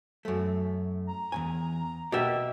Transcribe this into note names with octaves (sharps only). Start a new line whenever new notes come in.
F#2 A3
A#5
E2 G#2 G#5
B2 A#3 G4 E5 G5